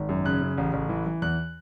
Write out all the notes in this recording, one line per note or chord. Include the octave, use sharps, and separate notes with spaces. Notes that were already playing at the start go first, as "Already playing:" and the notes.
Already playing: G#1
F#2
C#3 F#6
C#3
A1
A1
E3
E3
E2 F#6